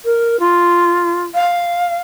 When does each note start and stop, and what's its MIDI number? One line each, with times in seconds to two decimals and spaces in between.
0.05 0.39 70
0.39 1.23 65
1.34 2.01 77